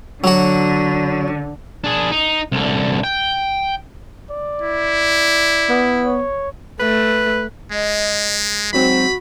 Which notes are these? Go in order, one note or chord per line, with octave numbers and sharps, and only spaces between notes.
D3 F#3 F#4
D4 G#4
D#4
C2 D3
G5
D5
E4
B3
C#5
A3 B4
G#3 D#5
G#2 F#3 C4 F#4 B5